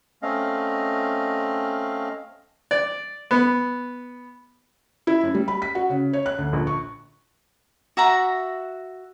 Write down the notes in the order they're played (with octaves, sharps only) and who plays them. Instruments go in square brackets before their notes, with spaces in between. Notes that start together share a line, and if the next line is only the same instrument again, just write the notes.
[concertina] A3 C4 C#4 D#5 F5
[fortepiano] D5
B3
[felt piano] E4
F#2
G3
B5
B6
F#4
C#3
C#5
F#6
D2
A#1
C#6
[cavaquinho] F#4 E5 F#5 A#5